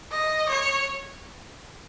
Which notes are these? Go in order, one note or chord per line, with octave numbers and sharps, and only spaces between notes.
D#5
C#5